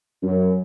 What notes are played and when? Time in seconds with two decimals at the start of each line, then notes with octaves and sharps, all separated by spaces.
0.23 F#2